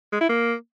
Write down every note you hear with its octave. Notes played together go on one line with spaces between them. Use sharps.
G#3
E4
A#3